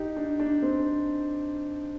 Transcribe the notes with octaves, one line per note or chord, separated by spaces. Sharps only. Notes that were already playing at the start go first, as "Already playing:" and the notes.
Already playing: D#4 G4
D4
D4
C4